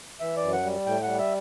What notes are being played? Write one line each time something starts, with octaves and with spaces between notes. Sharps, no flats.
E3 E5
F#2 D5
F#5
G3
A2 G5
G3 F#5
E5